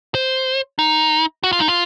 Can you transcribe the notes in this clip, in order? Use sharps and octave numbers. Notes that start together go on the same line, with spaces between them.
C5
D#4
F#4
F4
D#4
F4